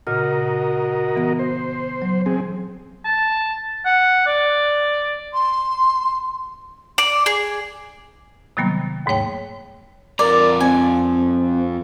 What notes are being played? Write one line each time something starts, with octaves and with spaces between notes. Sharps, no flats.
A#2 C#3 F#4 A#4 D#5 F6
E3 B3 A#6
C5
F#3
C4 G#4
A5
F#5
D5
C6
D5
G#4
C3 D#3 F#3 G3 A#3 B3
D#2 G#2 A3 C#5 G5
F2 A#4 D5 A#5
C4 G#5